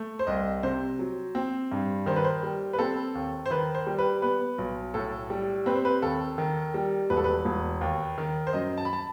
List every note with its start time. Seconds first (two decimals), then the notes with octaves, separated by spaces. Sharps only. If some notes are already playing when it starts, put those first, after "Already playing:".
Already playing: A3
0.19 C5
0.27 C2 D#5
0.63 C3 C5
0.99 F#3
1.35 C4
1.72 G2
2.06 D#3 C5
2.16 B4
2.25 C5
2.43 G3
2.73 B4
2.79 C4 A4
3.15 D#2
3.46 C5
3.51 D#3 B4
3.75 C5
3.87 G3
3.99 B4
4.22 B3 B4
4.58 B1
4.94 A2 A4
5.30 G3
5.66 C4 B4
5.76 C5
5.85 B4
6.02 D#2 A4
6.38 D#3
6.74 G3
7.10 E1 B4
7.17 A4
7.24 B4
7.45 E1
7.81 D#2
8.18 D#3
8.47 C5
8.53 F#2 D#5
8.78 A5
8.85 B5
8.93 A5